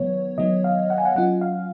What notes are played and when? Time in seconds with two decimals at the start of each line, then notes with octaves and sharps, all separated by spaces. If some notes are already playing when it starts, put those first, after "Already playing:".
Already playing: D#3 F#3 B3 C#5
0.38 D#3 F#3 B3 D#5
0.64 F5
0.90 F#5
0.98 G#5
1.05 F#5
1.16 F#3 C#4 F4 F#5
1.41 F5